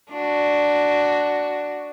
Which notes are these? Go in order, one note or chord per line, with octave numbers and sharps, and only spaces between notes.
D4 F#4